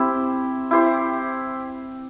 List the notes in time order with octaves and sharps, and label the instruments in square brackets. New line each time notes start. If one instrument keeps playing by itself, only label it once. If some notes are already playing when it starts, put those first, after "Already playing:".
Already playing: [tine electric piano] C4 [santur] E4 G4 C5
[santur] E4 G4 C5